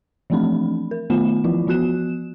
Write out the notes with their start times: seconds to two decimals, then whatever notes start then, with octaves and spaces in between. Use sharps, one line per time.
0.30 E3 F3 A3 C4 D4 B5
0.91 A#4
1.10 D#3 A3 B3 F4 B5 E7
1.44 E3 F3 E4 F4
1.67 F3 B3 F#4 F#6 E7